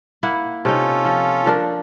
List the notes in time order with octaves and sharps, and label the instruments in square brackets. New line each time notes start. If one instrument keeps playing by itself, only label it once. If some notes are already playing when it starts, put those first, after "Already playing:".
[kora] A#3 E4 F#5
[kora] C3 D#4 [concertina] C#4 F4 A4
[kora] F3
F3 D4 A#4